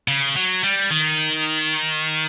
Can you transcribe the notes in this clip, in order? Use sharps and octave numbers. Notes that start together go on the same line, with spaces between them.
C#3
F#3
G3
D#3